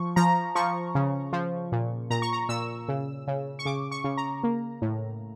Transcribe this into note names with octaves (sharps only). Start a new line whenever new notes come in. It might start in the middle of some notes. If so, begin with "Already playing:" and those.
Already playing: F3 C#6
F3 A#5
F3 C#6
C#3
F3
A#2
A#2 A#5
C#6
A#5
A#2 E6
C#3
C#3
C#6
C#3 D6
C#6
C#3
A#5
A#3
A2